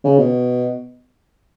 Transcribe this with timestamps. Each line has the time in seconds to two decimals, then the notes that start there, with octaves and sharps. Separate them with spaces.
0.04 C#3
0.18 B2